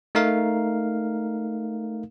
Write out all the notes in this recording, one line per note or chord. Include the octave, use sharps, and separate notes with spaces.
A3 D#4 A#4 F5